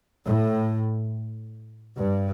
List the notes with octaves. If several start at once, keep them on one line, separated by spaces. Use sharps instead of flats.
A2
G2